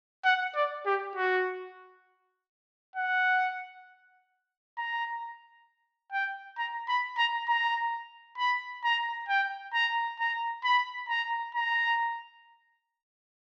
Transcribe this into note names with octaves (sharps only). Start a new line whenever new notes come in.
F#5
D5
G4
F#4
F#5
A#5
G5
A#5
B5
A#5
A#5
B5
A#5
G5
A#5
A#5
B5
A#5
A#5